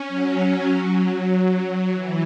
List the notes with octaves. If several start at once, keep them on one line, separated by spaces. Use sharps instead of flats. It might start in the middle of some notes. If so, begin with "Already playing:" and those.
Already playing: C#4
F#3
E3